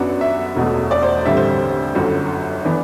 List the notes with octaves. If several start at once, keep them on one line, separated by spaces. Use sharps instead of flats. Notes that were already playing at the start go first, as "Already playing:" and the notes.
Already playing: F#2 F#3 B3 D4 F#5
E5
E1 E2 B2 A3
D5
C5
A1 G2 D3 G3 C4 E5
C5
G1 F#2 D3 F#3
E3 B3 D4